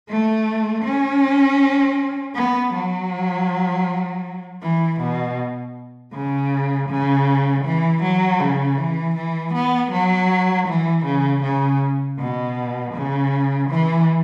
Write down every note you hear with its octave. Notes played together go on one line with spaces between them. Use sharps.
A3
C#4
B3
F#3
E3
B2
C#3
C#3
E3
F#3
C#3
E3
E3
B3
F#3
E3
C#3
C#3
B2
C#3
E3